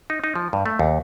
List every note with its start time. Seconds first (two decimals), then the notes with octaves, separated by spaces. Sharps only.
0.10 D#4
0.24 D#4
0.36 F3
0.53 G2
0.66 A3
0.79 D#2